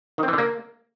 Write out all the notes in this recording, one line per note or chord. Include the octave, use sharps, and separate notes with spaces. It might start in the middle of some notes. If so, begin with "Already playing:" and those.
D#3
C4
E3
D3
A#3